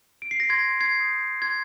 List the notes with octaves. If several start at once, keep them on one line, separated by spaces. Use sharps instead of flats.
D7
C7
A#6
C6 G#6
G#6 C7
D#6 G6
C6 G#6